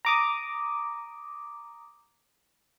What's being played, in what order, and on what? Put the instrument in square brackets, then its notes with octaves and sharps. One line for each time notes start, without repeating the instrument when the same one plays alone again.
[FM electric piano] A#5 D6 D#6